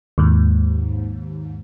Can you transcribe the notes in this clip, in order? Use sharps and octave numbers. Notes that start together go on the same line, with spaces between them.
D#2 G#2